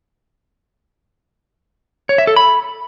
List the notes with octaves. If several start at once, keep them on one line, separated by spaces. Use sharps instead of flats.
C#5
E5
A4
B5